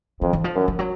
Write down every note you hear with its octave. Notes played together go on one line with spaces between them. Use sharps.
F2 E3
E3
F3
F#2
F3
F#3